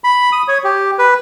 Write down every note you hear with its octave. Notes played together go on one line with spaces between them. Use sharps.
B5
D#6
C#5
G4
B4